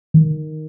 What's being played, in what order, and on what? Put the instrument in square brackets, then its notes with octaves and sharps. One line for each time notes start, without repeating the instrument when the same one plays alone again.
[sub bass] D#3